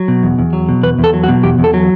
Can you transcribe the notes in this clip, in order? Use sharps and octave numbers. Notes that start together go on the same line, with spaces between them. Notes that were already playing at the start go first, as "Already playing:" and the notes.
Already playing: F#3
B2
E2
E2
F#3
B2
E2 B4
E2
A4
F#3
F#4
B2
E2 G4
E2
A4
F#3